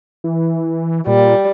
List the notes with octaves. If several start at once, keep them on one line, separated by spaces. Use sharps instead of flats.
E3
A#2 G3